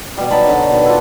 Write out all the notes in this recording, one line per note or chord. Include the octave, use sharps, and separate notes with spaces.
B2 G3
F#3 D#4 A5 B5
D3 F#3
B2 D#3 B4
D4 F4 A4